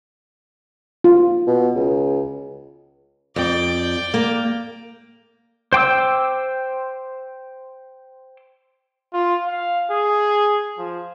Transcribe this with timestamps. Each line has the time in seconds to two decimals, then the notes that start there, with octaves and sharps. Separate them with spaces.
1.04 F4
1.47 B2
1.75 C#2
3.36 F2 D5 G5
4.14 A#3
5.73 C5 G5 D6 E6
9.13 F4
9.47 F5
9.91 G#4
10.78 F3